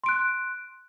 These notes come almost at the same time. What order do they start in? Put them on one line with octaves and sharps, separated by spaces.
C6 D7 F#6